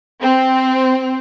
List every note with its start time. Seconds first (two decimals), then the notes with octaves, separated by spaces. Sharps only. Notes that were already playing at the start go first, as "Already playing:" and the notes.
0.20 C4